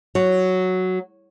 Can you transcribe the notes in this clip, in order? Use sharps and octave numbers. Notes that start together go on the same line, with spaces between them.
F#3